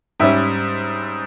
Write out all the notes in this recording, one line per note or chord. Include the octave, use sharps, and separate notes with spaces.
G#2 G3 C#4 E5